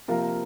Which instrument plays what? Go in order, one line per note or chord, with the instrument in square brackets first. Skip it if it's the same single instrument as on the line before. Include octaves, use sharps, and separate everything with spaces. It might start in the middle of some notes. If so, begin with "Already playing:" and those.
[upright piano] C3 F3 A#3 F4 A#4